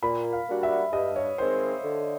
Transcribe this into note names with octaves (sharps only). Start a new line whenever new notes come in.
A#2 B5
F5
G3 A#3 D4 F#4
E5
G2 D#5
C#5
D#3 G#3 C4 C5
D3